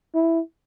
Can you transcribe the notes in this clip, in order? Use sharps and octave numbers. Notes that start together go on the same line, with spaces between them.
E4